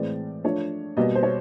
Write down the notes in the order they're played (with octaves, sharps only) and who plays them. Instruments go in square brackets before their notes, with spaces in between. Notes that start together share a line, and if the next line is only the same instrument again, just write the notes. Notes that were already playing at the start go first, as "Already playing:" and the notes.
Already playing: [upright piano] A2 E3 G#3 C4 D5
F3 A3 D4 C#5
B2 G3 A#3 D#5
C5
C#5